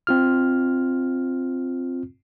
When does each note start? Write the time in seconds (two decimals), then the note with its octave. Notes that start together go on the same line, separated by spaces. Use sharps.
0.07 C4 F4 F6